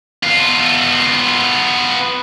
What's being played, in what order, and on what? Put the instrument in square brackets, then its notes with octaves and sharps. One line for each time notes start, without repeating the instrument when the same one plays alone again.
[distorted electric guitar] B3 F4